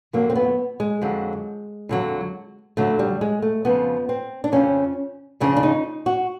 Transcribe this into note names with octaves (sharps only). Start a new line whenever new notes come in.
F2 D3 F#3 A#3
C4
B3
G#3
F2 D3 F#3
F2 D3 F#3
F2 D3 F#3 A3
G3
G#3
A3
F2 C#3 F3 B3
C4
D4
F2 C#3 F3 C#4
F2 C#3 F3 D4
D4
D#4
F#4